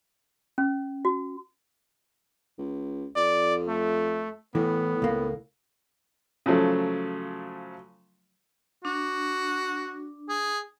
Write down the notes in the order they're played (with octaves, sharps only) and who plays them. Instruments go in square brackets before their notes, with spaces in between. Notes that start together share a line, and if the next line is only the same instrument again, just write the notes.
[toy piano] C#4
F#4
[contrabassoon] C#2
[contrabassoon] F2 [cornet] D5
[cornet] A3
[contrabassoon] A2 [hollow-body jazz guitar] E3 [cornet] B3
[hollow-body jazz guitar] C#2 A#3
[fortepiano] C#3 F3 F#3 A3
[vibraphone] D4 [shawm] F#4
[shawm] G#4